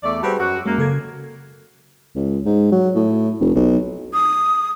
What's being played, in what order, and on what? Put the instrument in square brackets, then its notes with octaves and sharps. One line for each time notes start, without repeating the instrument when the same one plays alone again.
[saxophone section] E2 A3 D5
[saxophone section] G3 C4 F#4 [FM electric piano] G#4 B4 A5
[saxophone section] F#2 F#4 [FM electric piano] F#5 D6 E6
[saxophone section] F#2 A#3 [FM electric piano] G#3
[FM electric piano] C#3 A4 G#6
[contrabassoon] C#2
G#2
F#3
A2
F1
B1
[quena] D#6